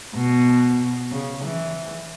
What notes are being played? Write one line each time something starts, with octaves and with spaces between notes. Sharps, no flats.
B2
C#3
E3